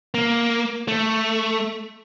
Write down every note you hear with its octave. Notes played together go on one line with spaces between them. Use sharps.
A#3
A3